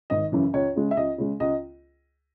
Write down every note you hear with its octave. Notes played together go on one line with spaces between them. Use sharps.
G#1 D#5
F#2 C#3 E3
C#2 C#5
C#3 G#3
E5
C#2 D#5
C#3 G#3
C#2 D#5